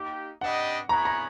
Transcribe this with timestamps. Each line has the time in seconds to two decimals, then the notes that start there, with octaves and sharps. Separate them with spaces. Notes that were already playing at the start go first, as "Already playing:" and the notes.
Already playing: A#3 D#4 G4
0.41 D4 G4 B4 D#5 F#5
0.89 B3 E4 G#4 C#5 F#5 A#5
1.05 A#5